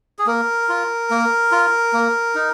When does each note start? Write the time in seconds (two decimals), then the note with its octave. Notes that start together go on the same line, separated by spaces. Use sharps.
0.19 G#4
0.27 A#3 A#4
0.69 F4
1.10 A#3
1.52 F4
1.93 A#3
2.35 D#4